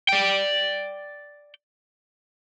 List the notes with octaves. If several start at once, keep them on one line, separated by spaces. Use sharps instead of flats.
D5 G5